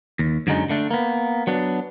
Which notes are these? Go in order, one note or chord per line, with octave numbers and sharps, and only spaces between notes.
D#2
F#2 D3 F#3 G#3 D#4
D3 A3 D4
A#3 B3
F#3 B3 D4